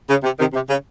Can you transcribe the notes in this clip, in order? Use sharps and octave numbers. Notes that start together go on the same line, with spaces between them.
C#3
C3
C3 D#3
C3
C#3